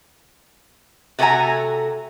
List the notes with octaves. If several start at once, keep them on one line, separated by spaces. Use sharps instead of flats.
C3 A3 F#4 C5 G#5 A#5